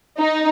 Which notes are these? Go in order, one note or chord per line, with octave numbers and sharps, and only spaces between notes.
D#4